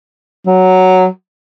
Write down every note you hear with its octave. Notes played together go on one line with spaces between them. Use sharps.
F#3